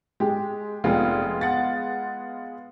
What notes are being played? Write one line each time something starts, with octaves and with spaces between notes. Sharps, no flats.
G#3 G4
F1 G#3 B3 F4
F#5 A6